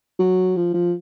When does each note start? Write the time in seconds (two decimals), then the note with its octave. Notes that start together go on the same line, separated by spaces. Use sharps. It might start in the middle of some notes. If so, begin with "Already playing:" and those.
0.19 F#3
0.56 F3
0.74 F3